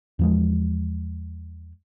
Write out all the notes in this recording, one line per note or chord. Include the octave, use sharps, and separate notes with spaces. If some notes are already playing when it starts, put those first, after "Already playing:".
E2 F3 G#3